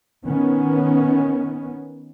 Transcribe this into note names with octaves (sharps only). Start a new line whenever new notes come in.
D#3 B3 C#4